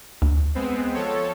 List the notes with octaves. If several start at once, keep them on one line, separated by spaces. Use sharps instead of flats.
D2
G#3 B3 C4
F3 A4 C#5